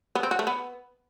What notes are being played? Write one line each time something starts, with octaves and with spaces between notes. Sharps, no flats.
B3
C4
F#4
A3
B3